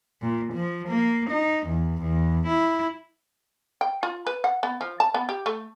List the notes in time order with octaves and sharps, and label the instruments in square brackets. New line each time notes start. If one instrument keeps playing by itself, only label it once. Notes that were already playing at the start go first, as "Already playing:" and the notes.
[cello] A#2
F3
A#3
D#4
E2
E2
E4
[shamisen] G5
F4
B4
F#5
B3
F3
A5
B3
G4
A3